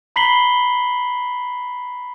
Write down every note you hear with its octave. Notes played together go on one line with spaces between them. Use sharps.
A#5 B5 B6 C7 F#7 G7